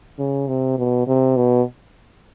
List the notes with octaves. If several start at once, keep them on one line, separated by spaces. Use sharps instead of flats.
C#3
C3
B2
C3
B2